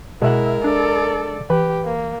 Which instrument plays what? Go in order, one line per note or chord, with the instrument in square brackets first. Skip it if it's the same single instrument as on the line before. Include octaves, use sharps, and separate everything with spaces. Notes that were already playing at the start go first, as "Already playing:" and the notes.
[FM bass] B2 [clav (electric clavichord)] G#3 E5 F#5 [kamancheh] E4 [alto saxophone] A#4
[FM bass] D4 [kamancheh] A4 D5
[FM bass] E3 [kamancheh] G4 [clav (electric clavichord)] B4
[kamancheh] A#3